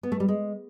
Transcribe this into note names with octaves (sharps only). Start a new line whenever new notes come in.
B3
A3
G3
G#3